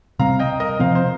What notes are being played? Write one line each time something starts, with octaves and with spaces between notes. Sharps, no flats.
C3 G3 C4 F5 A#5
D#5 G5
A#4 D#5
C3 F3 C4 C5 F5
C5